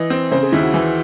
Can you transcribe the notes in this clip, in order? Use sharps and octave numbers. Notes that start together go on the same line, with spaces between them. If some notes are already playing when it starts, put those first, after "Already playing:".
Already playing: E3 D#5
C4
C#3 C5
G#4
D#2 E4
F#4
E3